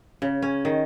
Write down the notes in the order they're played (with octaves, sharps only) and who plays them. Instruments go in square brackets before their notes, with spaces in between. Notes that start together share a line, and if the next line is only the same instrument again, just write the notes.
[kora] C#3
C#4
D#3